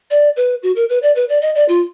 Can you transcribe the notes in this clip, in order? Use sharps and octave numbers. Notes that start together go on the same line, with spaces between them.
D5
B4
F#4
A#4
B4
D5
B4
D5
D#5
D5
F4